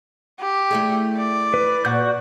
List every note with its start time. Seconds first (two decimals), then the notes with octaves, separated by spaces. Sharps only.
0.40 G4
0.71 A3 E4 G#4
1.17 D5
1.54 B4
1.85 A#2 F#4 F#5 G6